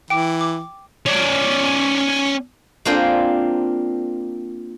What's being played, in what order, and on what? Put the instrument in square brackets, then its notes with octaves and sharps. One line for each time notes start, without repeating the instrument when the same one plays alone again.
[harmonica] E3 [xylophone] G5 D6
[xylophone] D6
[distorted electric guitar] C#4 D5
[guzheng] A#3 C4 D4 F4 G5 G#5